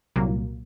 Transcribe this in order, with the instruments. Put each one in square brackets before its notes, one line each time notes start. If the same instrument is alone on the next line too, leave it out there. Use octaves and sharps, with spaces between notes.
[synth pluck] C2 A#2 F#3 A#3